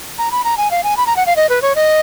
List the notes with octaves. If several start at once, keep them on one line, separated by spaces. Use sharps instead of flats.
A#5
B5
A#5
G#5
F5
G#5
B5
A#5
F#5
F5
D#5
B4
C#5
D#5